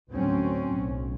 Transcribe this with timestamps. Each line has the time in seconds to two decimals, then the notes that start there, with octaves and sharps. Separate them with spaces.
0.11 D2 A2 D3 F#3 C4 C#4
0.77 B1